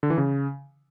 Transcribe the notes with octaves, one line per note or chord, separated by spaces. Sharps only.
D3
E3
C#3